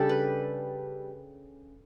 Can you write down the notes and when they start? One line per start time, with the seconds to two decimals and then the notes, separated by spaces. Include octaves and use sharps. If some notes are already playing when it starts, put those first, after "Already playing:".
Already playing: C#3 G3 D4 G4 A4
0.09 B4